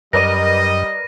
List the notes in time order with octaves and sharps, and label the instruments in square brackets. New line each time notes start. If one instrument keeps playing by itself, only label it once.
[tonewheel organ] F#2 [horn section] G3 D#5 [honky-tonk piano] A#4 B4 D5 [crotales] A#6 D#7